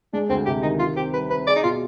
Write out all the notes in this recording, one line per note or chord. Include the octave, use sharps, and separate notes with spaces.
G#3 D4
D2 C4
C3 G4
D#3 D#4
D#3 F4
C4 G4
G3 B4
C4 B4
G#4 D5
D#4
B2 F4